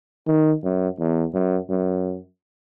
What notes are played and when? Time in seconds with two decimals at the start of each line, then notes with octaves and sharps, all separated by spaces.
0.27 D#3
0.64 F#2
0.99 E2
1.34 F#2
1.70 F#2